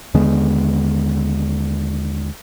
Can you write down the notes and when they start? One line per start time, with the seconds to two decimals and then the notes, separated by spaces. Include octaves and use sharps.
0.14 D#2 D3 G#3 B3